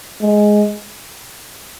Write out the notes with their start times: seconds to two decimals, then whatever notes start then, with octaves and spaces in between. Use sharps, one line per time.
0.21 G#3